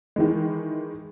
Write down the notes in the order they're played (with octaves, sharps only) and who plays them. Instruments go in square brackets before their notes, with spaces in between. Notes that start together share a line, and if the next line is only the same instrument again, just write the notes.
[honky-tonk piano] D#3 E3 G#3